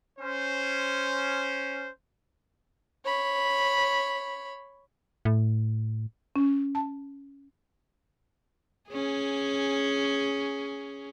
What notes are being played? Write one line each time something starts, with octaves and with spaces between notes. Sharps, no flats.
C#4 C5
C#5 B5
A2
C#4
A5
C#4 G#4